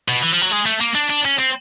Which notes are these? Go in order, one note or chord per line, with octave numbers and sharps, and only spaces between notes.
B2
E3
F3
F#3
G#3
A3
A#3
D4
D4
C#4
C4